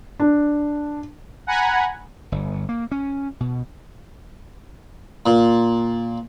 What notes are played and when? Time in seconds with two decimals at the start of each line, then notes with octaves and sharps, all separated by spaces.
0.20 D4
1.47 F#5 G#5 A#5 B5 G#6
2.32 G1
2.69 A#3
2.92 C#4
3.40 B2
5.26 A#2